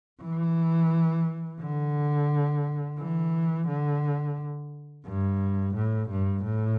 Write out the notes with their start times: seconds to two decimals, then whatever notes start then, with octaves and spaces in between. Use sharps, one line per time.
0.21 E3
1.60 D3
2.98 E3
3.68 D3
5.06 G2
5.76 A2
6.10 G2
6.44 A2